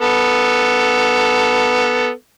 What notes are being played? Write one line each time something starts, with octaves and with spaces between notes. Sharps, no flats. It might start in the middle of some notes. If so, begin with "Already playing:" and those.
B3 A4